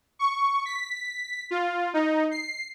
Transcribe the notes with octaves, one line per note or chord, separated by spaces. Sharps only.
C#6
B6
F4
D#4
C7